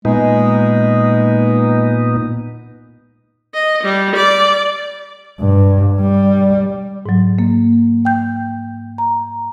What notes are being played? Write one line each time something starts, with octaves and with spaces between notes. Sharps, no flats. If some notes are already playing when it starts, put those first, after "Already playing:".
A#2 G#3 B3 D#4
D#5
G3
D5
G2
G3
G#2 F#3
A#3
G5 G6
A#5